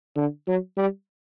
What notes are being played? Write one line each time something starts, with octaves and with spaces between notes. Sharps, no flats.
D3
F#3
G3